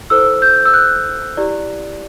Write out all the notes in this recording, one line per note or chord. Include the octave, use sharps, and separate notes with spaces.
E4 A4 C5 E6
G6
E6
F#6
E4 G4 D5